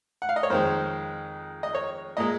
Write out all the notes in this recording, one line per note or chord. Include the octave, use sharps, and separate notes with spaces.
F#5
F5
D#5
C#5
F2 D#3 G#3 C5
D#5
C#5
A#2 G#3 D#5